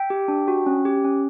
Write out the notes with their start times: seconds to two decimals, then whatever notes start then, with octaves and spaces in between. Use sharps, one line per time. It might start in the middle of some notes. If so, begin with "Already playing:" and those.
Already playing: E5 G5
0.10 G4
0.28 D4
0.48 F#4
0.66 C#4
0.85 G4
1.04 C#4